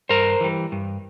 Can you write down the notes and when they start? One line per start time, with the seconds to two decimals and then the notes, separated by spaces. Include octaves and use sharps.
0.09 G2 A#4 C5
0.41 E3 G3
0.72 G2